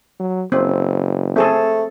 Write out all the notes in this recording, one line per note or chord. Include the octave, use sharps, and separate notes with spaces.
F#3
F#1 C4
A3 C4 G#4 A4